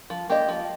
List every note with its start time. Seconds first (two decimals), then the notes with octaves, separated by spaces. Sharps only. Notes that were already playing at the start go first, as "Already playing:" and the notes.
0.10 F3
0.29 A#3 G4 D#5
0.49 F3